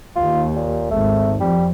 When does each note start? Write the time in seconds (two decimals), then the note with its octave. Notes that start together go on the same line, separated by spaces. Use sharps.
0.16 D#2 F4
0.56 A#2
0.91 G#1 A3
1.40 F2 G3